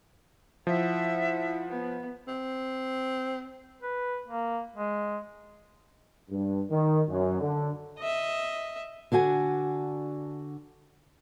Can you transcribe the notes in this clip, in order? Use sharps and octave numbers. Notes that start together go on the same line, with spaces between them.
F3 E4 E5 F#5
B3
C4
B4
A#3
G#3
G2
D#3
F#2
D3
D#5 E5
D3 D4 F#4 G#5